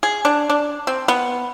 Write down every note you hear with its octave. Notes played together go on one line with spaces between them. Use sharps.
G#4
D4
D4
C4
B3